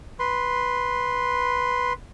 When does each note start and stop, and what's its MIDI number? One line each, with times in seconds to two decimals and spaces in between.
0.19 1.93 71
0.19 1.93 84